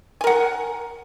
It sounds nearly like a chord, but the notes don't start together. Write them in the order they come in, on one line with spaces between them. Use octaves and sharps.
G#5 A#4 F#5